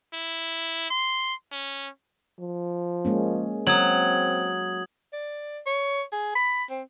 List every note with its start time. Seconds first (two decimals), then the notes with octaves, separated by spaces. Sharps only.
0.14 E4
0.90 C6
1.52 C#4
2.40 F3
3.05 G#3 A#3 C#4
3.67 F#3 C4 D#6 G#6 F#7
5.12 D5
5.66 C#5
6.12 G#4
6.35 B5
6.70 C4